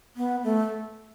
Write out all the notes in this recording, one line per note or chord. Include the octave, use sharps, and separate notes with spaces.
B3
A3